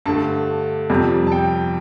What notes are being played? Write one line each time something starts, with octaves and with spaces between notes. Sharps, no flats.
G2 D3 A3 A5
F2 C3 G3
A5
G5